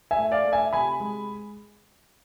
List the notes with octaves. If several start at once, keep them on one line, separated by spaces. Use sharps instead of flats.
E5 G#5
A3
D5 F5
A3
E5 G#5
C3 G#5 B5
G#3